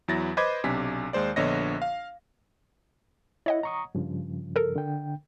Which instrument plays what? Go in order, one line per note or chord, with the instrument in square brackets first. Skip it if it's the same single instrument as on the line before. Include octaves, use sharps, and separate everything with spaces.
[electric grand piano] E2 F#3 E4 A6 A#6
B4 C5 D#5 B5 D6 G#6
B1 C3 D4 G#5 B6
D#2 G#3 C5 D5
A#1 D3 B3 C#5 D#5 A#6
F5
[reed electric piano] E4 [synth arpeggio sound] C#5 D#5 F#5
[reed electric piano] A#5 C#6 D#6
G2 C#3 F3
[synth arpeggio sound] A4 A#4
[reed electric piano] D3 G5